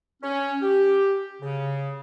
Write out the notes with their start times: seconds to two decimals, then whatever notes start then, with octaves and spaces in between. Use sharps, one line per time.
0.23 C#4
0.62 G4
1.41 C#3